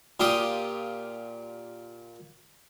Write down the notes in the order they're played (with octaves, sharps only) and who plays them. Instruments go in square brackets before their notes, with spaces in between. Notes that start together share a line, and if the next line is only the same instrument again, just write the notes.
[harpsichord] A#2 F4 G4 D#6